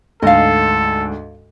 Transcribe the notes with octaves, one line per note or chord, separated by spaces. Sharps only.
D2 G#2 A4 D#5 F5